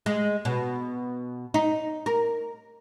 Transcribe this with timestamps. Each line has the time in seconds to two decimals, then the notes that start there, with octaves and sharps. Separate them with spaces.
0.06 G#3
0.45 B2
1.54 D#4
2.06 A#4